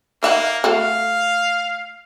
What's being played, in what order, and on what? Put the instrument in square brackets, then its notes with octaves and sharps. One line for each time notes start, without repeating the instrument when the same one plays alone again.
[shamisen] D#3 E5 F#5 [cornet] A#3
[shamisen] A3 F#4 A4 [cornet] F5